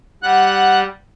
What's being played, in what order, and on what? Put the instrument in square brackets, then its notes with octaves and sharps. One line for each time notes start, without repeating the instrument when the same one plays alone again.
[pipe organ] G3 [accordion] F#5 F#6